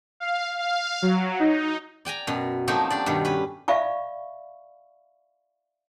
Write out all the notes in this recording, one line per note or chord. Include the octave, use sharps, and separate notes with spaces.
F5
F5
F#3
D#4
D5 G5 G#5 A#5
F#2 B2
F3 F#3 A3 A#3 C4 D#4
D4 G4 D5
G2 B2 D#3
C#4 B4
D5 E5 F5 B5 C#6